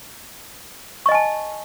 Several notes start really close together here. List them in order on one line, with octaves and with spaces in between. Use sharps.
C#6 D#5 G#5 A5